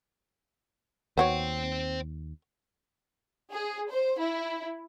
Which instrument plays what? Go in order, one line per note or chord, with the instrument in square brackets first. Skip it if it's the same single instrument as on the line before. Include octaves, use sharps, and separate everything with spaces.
[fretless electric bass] D#2 [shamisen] B3 F#4 C#5 [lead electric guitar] C5 G5
[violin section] G#4
C5
E4